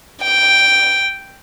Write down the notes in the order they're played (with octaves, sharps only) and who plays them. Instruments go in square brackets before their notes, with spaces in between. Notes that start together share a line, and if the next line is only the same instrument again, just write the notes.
[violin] G5